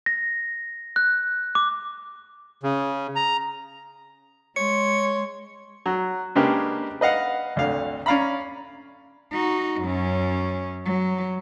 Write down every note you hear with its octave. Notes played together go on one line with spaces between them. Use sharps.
A#6
F#6
D6
C#3
A#5
G#3 C#5 C6 C#7
F#3
C#3 G#3 A#3 D4 G4 B4
B4 D#5 F5 F#5
G#1 D2 D3 F5
C#4 D5 F5 A#5 B5
D#4 F#4
F#2 C#4
F#3